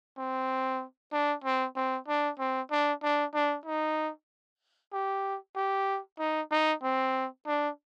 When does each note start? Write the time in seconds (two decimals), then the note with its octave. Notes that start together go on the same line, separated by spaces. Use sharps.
0.18 C4
1.12 D4
1.44 C4
1.76 C4
2.08 D4
2.39 C4
2.71 D4
3.03 D4
3.34 D4
3.66 D#4
4.93 G4
5.56 G4
6.19 D#4
6.51 D#4
6.83 C4
7.47 D4